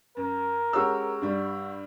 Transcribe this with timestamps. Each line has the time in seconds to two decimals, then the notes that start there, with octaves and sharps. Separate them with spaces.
0.17 F#2 A#4
0.73 G#3 C#4 F#4 G4 E6
1.21 G2 G3